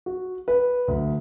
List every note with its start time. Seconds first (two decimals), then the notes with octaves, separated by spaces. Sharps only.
0.06 F#4
0.48 B4
0.88 D2